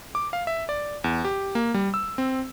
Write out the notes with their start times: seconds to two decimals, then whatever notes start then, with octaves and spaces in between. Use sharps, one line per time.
0.15 D6
0.33 F5
0.47 E5
0.69 D5
1.04 E2
1.25 G4
1.55 A#3
1.74 G3
1.94 E6
2.18 C4